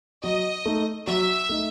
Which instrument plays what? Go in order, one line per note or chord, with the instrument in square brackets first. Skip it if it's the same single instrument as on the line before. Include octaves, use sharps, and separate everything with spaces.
[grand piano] F#3 [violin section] D#5
[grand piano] A3 D#4
[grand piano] F#3 [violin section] E5
[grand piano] A3 D#4